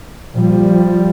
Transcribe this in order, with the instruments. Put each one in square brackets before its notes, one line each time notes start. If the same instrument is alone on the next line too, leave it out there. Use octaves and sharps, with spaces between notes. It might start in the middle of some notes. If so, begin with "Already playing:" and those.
[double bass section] A#2 F3 G3